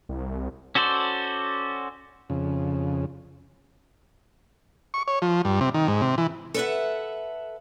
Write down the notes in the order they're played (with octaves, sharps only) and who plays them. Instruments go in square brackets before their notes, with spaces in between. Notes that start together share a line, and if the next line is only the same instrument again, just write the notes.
[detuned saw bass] C2
[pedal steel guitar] C#4 F#4 A4 C5 D5
[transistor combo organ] F2 C#3
C#6
C#5
F3
G2
C3
D#3
G#2
C3
E3
[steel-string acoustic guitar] A4 B4 C#5 E5 F#5